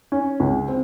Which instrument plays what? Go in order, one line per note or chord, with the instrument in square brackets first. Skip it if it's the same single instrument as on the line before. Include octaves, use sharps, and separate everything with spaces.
[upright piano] C#4
C#2
C4